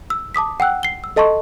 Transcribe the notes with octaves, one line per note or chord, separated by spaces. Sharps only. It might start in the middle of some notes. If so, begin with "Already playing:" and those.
E6
A5 D6 D#6 B6
F#5 G5 E6 F#6
C7 G7
E6
A4 D#5 A5 C6 C#6